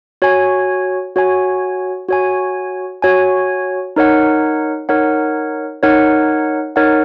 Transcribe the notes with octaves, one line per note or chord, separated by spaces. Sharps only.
F#4 C#5 G#5
F#4 C#5 G#5
F#4 C#5 G#5
F#4 C#5 G#5
D#4 A#4 C#5 F#5
D#4 A#4 C#5 F#5
D#4 A#4 C#5 F#5
D#4 A#4 C#5 F#5